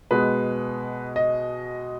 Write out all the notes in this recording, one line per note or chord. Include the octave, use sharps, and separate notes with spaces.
B2 G#3 B3 B4
D#5